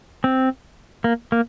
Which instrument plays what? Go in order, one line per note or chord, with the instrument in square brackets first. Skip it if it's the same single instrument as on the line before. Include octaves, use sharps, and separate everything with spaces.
[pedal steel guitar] C4
A#3
A#3